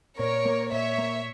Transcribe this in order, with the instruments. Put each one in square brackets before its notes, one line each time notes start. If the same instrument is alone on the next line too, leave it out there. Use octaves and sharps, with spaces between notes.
[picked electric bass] A#2 [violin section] A#4 C#5
[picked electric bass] A#3
[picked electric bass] A#2 [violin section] C#5 E5
[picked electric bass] A#3